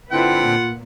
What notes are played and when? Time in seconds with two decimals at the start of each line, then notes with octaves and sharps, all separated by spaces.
0.12 D3 C4 E4 F4 B4 F#5 G5
0.46 A#2